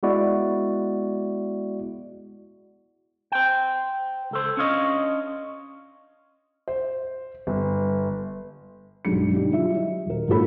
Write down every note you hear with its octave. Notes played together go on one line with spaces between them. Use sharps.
G#3 B3 E4 F#4 D5
C5 G5
C#2 A4 C5
C#4 D4 F4 C#5 D#5
C5
G1
B1 G2 G#3 C#7
D3 G3 D#4
F#3 E4 F4 E5
D#5
D#1 A#4
G#2 A#3 F4 A4 B5